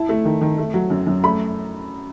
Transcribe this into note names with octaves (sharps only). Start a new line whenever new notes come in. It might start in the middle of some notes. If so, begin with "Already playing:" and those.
Already playing: E4 A5
A3
D#3
D#3
A3
F#3
F#2
F#2
A3 B5